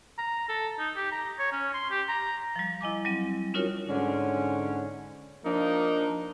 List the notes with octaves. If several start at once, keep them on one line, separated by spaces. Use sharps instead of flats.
A#5
A4
D#4
G4
A#5
C#5
C#4
C6
G4
A#5
F3 G3
E4 D#5 G#5 D6
F#3 G3 C4
C#4 D#4 F4 F#4 A#4 C#5
G#2 D3 C#4
F3 A#3 D4 D#4